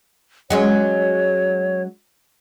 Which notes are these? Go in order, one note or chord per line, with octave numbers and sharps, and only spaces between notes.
F#3 G#3 C#4 C#5